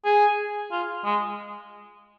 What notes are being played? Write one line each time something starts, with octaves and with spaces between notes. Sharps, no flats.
G#4
F4
G#3